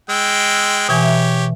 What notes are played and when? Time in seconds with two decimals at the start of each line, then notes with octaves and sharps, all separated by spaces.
0.09 G#3 G5 E6
0.89 B2 E3 G4 C#5 G#5
1.03 E5